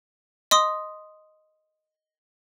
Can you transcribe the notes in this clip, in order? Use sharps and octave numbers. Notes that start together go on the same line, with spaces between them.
D#5 C6 D#6